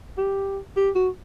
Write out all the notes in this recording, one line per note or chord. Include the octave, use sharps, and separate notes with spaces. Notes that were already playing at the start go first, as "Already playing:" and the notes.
G4
G4
F#4